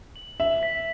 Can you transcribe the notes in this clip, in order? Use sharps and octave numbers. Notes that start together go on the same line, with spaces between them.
F#7
E5 F#7
B6